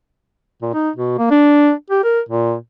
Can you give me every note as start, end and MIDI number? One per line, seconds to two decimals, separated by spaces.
0.62 0.71 46
0.74 0.90 63
0.96 1.14 47
1.19 1.27 58
1.31 1.71 62
1.91 2.02 67
2.04 2.20 70
2.29 2.55 46